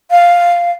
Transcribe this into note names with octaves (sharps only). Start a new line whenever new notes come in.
F5